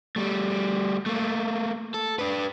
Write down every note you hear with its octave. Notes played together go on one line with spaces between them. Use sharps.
G3 A3
A3 A#3
A4
D4 B4